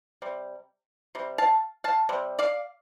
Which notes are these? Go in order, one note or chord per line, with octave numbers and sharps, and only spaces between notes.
C3 G3
C3 G3
F5 A5
F5 A5
C3 G3
D5 F5